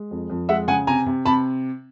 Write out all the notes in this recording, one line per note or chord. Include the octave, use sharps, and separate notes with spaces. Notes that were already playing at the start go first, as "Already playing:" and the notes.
Already playing: G#3
F2
F2
G#3 E5 F#5
C#3 F#5 G#5
C3 G#5 A#5
C3
C3 A5 B5